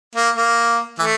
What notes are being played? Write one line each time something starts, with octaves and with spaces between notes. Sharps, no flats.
A#3
A#3
E3 A3